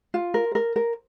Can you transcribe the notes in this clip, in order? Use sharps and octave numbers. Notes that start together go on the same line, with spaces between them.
F4
A#4
A#4
A#4